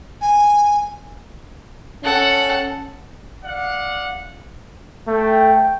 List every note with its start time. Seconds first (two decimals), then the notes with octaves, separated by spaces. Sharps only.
0.21 G#5
2.04 C#4 A4 F#5
3.45 D5 F5 F#5
5.08 A3 G5